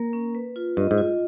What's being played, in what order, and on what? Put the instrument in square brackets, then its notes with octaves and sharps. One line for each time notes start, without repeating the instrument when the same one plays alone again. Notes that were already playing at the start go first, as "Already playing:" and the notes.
Already playing: [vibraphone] A#3 A#4
C#4
B4
F4
[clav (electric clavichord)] G2 [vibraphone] D#5
[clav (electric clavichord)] G#2
[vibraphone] F4